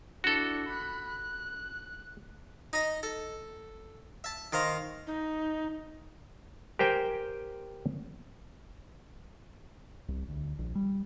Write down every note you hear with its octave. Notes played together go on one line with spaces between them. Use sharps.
D4 E4 F#4 A4
B5 F#6
F#6
D#4 D#5
A4
E5 A5
D#3 C5 F5 A#5
D#4
G4 A#4 C5 G5 G#5
C2
D2
A#1
G3